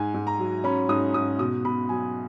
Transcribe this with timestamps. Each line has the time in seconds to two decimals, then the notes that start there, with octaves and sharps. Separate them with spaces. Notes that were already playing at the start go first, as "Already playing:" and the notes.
Already playing: G#2 G#5
0.14 G#2
0.27 A#5
0.39 F#3
0.64 C#4 B5
0.89 G#2 D#6
1.14 G#2 D#6
1.39 B2 D#6
1.64 B2 B5
1.89 F#3 G#5